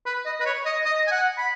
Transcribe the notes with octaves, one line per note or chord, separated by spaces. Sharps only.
B4
D#5
B4
C#5
D#5
D#5
G#5
F#5
B5